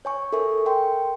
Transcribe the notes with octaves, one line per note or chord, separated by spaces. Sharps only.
C#5 G#5 C#6
A4 A#4 E5 G#5 C#6
A#4 G5 C6